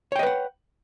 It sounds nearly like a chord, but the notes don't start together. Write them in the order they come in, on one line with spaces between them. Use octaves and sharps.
C#5 G5 D#5 B4 F#5